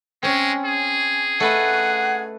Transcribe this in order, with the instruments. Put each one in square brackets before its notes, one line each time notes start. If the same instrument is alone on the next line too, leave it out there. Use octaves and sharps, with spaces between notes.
[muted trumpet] G#3 [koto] C4 C#4
[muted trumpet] G#4
[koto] A3 B4 D#5 [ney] F#5